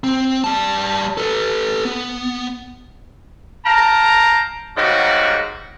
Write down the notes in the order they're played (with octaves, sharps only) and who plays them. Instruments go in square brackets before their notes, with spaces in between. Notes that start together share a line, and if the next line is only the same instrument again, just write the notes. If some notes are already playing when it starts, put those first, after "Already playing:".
[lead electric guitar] C4
G3 A5
A4 B4
B3
[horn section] F5 G5 A5 A#5
G#2 C#3 F#3 G3 A#3 F#4